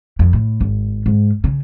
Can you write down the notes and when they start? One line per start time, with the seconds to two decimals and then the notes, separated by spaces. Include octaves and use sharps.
0.19 F2
0.33 A2
0.61 G#1
1.06 G#2
1.44 C#3